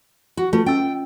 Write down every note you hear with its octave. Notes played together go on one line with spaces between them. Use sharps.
F#4
A3 F4 B4
C#4 D#5 G5 E6